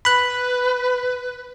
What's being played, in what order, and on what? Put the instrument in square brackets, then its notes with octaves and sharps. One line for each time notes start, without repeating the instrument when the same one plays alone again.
[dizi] B4 [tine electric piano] B5 F#6